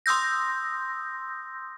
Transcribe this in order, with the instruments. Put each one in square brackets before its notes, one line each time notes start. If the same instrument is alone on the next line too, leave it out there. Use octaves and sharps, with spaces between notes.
[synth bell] C6 D#6 E6 G6 A#6